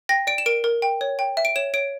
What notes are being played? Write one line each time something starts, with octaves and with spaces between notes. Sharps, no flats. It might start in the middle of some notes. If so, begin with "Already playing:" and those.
G5 A#6
D5 D7
E7
A#4 D7
A#4
G5
C#5
G5
E5
D7
C#5 E7
C#5 D7